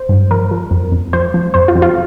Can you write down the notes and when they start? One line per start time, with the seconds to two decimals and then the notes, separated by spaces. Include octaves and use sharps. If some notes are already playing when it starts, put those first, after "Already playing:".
Already playing: C5
0.09 G2
0.31 F3 A#4
0.51 F3
0.71 F2
0.92 F2
1.13 F3 C5
1.34 F3
1.54 F2 C5
1.68 F4
1.75 F2
1.82 F4